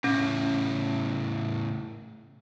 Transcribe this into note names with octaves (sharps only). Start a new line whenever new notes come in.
A2 C#3 C#4